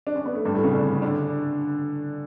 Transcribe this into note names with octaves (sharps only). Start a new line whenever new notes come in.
D4
C#4
B3
A3
G2 G3
A2 A3
C#3 C#4
D3 D4
D3 D4